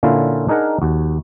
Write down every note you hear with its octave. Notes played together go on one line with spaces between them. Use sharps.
A#2 D3 A#3 C#4 E4 F4
D4 D#4 G#4 A#4 F#5
D#2 F#4